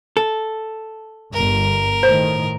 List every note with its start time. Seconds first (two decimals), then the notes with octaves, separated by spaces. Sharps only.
0.17 A4
1.34 G1 A#4
2.03 A2 D#3 C5